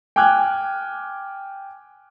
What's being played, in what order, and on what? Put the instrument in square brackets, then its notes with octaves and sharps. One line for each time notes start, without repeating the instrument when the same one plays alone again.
[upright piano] G5 G#5 D6 F6 F#6 G#6